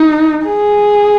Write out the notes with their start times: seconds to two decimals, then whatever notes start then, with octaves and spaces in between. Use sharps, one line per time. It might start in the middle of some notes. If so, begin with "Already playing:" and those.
Already playing: D#4
0.46 G#4